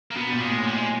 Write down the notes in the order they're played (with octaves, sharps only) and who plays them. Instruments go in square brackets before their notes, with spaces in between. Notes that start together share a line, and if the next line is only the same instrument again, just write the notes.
[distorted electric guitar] A#3
[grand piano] B2 [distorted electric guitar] B3
[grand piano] A#2 [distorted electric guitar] G3
[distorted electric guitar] G#3
[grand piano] A2
[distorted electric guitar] G3
G#3